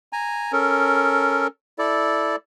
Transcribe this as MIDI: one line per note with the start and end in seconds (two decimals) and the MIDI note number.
0.13 0.52 80
0.13 0.52 82
0.52 1.47 61
0.52 1.47 69
0.52 1.47 70
1.79 2.36 64
1.79 2.36 69
1.79 2.36 74